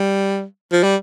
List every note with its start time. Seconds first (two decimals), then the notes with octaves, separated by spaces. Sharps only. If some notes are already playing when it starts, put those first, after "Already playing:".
Already playing: G3
0.72 F3
0.83 G3